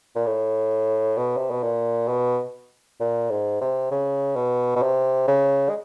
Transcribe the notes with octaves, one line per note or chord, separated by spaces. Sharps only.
A#2
A2
B2
C3
B2
A#2
B2
A#2
G#2
C3
C#3
B2
B2
C3
C#3
G#3